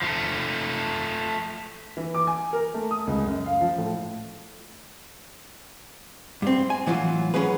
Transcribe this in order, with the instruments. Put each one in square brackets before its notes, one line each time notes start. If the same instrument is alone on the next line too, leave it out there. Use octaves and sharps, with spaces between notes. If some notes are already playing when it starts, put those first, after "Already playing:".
[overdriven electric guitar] F3 A3
[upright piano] E3
D6
G#5
A#4
A3
D#6
C#2
F#2
F5
F3
A2
[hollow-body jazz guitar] G2 C4
G#5
A2 E3 F#3 F4
F#3 C#4 G#4 B4